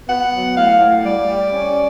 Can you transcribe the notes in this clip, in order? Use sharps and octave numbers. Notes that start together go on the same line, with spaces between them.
B3 F#5
F#3
A2 F5
A2
G3 D5
G3
C#4